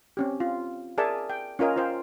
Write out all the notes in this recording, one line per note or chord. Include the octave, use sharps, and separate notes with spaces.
C4 C#4 G4
F4
G#4 A#4 D5 E5 G#5 A5
G5
C#4 F4 A#4 D#5 G#5
F4 C5 G5